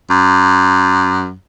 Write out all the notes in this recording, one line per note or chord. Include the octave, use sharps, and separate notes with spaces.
F#2